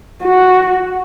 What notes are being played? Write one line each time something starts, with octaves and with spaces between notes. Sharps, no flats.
F#4